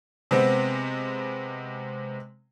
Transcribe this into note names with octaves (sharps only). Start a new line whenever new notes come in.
C3 G#3 B3 C4